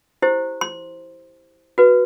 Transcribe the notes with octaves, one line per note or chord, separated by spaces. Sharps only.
E4 G4 C5
C6
F#4 B4